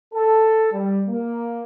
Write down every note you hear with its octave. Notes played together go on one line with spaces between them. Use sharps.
A4
G3
A#3